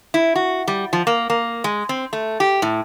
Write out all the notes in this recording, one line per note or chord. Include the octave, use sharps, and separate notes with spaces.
E4
F#4
G3
F3
A#3
A#3
G#3
C4
A3
G4
A2